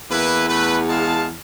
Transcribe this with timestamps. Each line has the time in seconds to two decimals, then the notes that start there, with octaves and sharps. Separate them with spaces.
0.10 E2 A#3 E4 B4
0.49 A3 B4
0.89 G#3 F5 A5